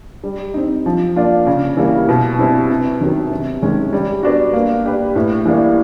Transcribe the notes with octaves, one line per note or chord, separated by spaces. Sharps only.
G3
C4 D#4
F3
A#3 D4 F4
C#3
E3 G3 A#3
B2
G3 C4 E4
C3
D#3 F#3 B3
C3
D#3 G#3 C#4
G3
B3 D4 F#4
A#3
D4 G4 B4
A2
E3 G3 A#3 D4